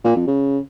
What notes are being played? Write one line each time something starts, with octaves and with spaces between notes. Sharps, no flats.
A#2
F2
C#3